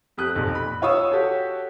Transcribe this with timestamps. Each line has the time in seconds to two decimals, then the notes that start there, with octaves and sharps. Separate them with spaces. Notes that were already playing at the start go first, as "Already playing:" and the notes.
0.17 F2 G4 D#6 F#6
0.36 B1 F2 A#2
0.55 B5
0.82 F4 C#5 C#6 D#6 E6
1.11 F#4 G4 A4 C#5